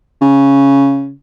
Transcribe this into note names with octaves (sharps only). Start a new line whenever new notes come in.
C#3